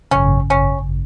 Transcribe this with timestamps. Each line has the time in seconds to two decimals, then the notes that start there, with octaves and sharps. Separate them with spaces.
0.11 G#1 F#2 C#3 C#4
0.50 C#4